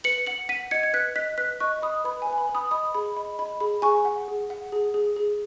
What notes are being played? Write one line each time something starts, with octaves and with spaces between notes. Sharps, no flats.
B4 C#7 F#7
F#5 C#7 F#7
F#5 B6 D#7
D#5 G#6 C#7
G#6
B4 F#6 B6
D#5 F#6 B6
B4 F#6 B6
D#5 C#6 F#6
D#5 B5 D#6
B4 B5
G#5
B4
G#5
B5
B4
B5 D#6
D#5 B5 D#6
G#4 B5
D#5 B5
D#5 B5
G#4 B5
G#4 G#5 C#6
F#5
G#4
F#5
G#4
G#4
G#4